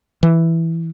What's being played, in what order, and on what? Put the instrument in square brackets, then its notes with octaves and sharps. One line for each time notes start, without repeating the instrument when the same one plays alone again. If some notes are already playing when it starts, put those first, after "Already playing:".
[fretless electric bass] E3